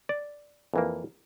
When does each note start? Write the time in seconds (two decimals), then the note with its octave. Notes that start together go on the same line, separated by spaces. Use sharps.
0.09 D5
0.74 F2 E3 A#3